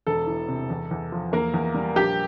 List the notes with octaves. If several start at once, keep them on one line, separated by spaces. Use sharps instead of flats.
E1 A4
E3
C3
E2
E2
F3
E2 A#3 A#4
E2
G3
A#1 G4 G5